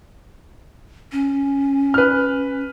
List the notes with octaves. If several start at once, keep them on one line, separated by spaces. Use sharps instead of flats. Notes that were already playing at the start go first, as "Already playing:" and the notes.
C#4
B4 F6